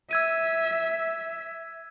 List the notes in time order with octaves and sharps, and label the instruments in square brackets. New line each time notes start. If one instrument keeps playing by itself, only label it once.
[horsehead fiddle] E5 [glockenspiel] E6 G#6 D#7